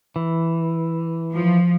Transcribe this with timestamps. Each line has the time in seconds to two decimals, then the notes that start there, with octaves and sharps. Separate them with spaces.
0.16 E3
1.33 F3